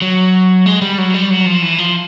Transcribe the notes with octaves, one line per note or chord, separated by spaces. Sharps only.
F#3
G#3
G3
F#3
G3
F#3
F3
E3
F3